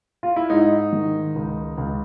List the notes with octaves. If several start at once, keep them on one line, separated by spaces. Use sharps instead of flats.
F4
E4
G#2 D#4
D#3
C#2
C#2